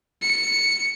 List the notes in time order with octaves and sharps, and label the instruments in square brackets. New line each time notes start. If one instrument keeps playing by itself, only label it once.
[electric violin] C#7